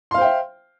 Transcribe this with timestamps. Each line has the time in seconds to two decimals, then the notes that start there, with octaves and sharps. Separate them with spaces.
0.11 C6
0.14 F5
0.18 C5
0.21 G5
0.24 E5